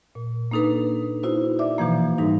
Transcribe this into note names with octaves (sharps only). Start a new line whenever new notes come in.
A#2
A#3 D4 D#4 A4 B4
D#4 E4 F#4 C5
D5 E5 D6
B2 E3 F3 A#3
G#2 E3 G3 D#4